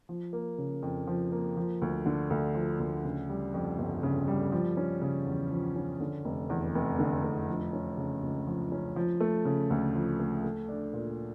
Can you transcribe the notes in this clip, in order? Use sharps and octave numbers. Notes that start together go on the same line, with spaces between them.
F3
A#3
C#3
F2
F3
A#3
F3
D2
D3
D2
F3
D2
C#3
G3
F2
G1
C#3
G3
F3
C#4
C#3
E2
F3
C#4
D3
F1
E2
F1
D3
F1
F3
C#4
C#3
C#2
F3
C#4
F3
A3
C#3
D2
F3
A3
A3
D4
A#2